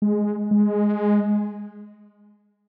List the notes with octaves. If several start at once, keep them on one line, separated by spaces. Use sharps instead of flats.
G#3
G#3